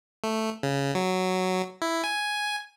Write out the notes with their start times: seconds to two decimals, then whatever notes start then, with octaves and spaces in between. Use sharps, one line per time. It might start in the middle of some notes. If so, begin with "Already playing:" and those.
0.24 A3
0.63 C#3
0.95 F#3
1.82 E4
2.04 G#5